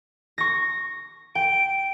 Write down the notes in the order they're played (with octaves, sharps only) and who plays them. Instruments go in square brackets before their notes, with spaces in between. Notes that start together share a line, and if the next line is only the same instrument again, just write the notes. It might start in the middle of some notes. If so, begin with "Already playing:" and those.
[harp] C#6 A#6
[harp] G5 [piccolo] D7